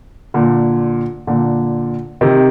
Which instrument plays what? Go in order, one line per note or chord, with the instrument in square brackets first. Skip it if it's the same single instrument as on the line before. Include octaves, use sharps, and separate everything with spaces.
[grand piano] A#2 D3
A#2 D3
C3 D#3